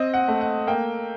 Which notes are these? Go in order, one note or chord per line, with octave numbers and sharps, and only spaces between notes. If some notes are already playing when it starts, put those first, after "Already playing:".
Already playing: C4 D#5
F#5
A3
F#5
A#3 G5